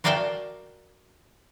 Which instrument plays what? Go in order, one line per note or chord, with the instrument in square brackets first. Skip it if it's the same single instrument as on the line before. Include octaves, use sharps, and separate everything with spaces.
[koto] F#4 A#4 D5 F5 G5 A5